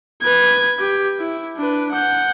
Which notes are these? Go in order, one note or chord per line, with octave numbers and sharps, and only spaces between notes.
B4 G#6
G4
E4
D4 B4
F#5 G6